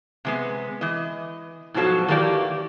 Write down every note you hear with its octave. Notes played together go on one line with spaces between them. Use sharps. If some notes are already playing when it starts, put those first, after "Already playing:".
C3 G#3 B3
E3 D#5
G#2 B2 F3 F#3 A4
D#3 E3 A#3 G4 D5